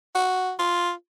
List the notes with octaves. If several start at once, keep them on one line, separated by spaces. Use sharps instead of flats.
F#4
F4